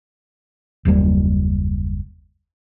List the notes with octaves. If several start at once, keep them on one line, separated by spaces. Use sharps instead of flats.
F#1 D#2 G3 A#3